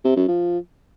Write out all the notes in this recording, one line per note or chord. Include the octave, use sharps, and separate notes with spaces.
C3
F#2
F3